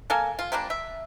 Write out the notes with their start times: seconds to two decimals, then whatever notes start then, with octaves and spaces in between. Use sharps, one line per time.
0.10 A#3 A4 F5 G#5
0.39 F4
0.52 F3 G3 A#3 D4
0.70 E5